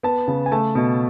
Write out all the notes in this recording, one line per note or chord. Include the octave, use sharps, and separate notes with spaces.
B3 A5
C#3
G#5
A3 A5
B2